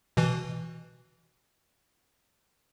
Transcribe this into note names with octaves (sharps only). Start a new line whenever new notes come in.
B2 E3